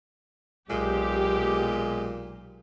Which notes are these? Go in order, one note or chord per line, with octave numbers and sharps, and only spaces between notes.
B1 A#2 G#3 G4